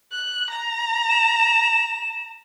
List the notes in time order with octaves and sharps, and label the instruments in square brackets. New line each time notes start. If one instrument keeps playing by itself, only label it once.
[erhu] F#6
A#5
[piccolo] E7